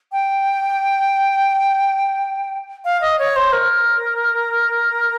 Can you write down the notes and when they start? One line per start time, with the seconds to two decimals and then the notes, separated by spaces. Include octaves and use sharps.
0.12 G5
2.85 F5
3.01 D#5
3.19 C#5
3.36 C5
3.53 A#4